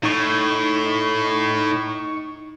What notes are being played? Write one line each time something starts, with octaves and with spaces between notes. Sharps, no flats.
A2 D#4 C#6